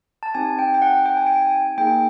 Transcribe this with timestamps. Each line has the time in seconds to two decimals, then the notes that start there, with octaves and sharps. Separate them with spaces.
0.23 A5
0.35 C4 D#4 G4 G#5
0.59 G5
0.74 G5
0.82 F#5
1.06 G5
1.17 G#5
1.27 G5
1.42 G#5
1.78 A#3 D#4 G#4 G5